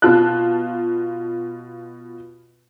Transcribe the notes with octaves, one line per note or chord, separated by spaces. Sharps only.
B2 F4 A5 F#6